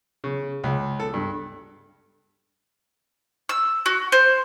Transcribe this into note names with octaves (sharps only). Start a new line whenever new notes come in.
C#3
C#2
A4
G2
E6
F#4
C5